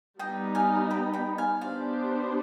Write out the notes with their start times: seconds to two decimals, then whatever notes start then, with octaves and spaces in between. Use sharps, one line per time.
0.19 G3 B3 D#4 D#5 G5
0.55 F5 G#5
0.91 G5 B5
1.13 G5 B5
1.38 F5 G#5
1.61 B3 D4 G4 C5 D5 F5